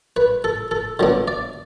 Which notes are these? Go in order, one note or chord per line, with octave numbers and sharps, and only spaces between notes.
B4
A4
A4
D3 F#3 B3 D4
D5